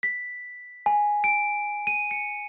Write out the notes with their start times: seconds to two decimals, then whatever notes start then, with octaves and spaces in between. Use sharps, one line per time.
0.03 B6
0.86 G#5
1.24 D7
1.87 D#7
2.11 C#7